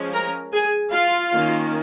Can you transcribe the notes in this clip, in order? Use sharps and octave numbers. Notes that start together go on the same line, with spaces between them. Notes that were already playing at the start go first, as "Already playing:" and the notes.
Already playing: F3 G#3 C#4
A#4 A#5
G#4 G#5
F4 F5
D#3 A#3 C#4